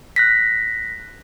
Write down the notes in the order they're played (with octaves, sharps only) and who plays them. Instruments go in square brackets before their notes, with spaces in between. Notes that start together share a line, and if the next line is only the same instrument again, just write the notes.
[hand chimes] F#6 A#6 B6